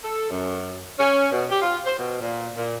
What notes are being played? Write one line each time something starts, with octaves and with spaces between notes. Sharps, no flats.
A4
F#2
C#4
B2
G4
F4
C5
B2
A#2
A#2